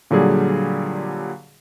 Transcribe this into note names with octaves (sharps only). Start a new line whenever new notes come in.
A#2 D3 F#3 G3 G#4